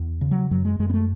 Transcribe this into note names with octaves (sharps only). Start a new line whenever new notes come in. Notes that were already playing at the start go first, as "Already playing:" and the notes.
Already playing: E2
C#3
F#3
F#2 F#3
G#3
F#2 G#3
B3
A3